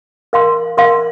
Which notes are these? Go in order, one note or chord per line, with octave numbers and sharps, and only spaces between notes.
A#4 F5 C6
A#4 F5 C6